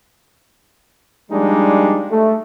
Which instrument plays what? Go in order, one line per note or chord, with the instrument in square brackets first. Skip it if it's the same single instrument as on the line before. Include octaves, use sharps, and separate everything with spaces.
[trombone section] F3 G3 G#3 A#3 D4 D#4
A3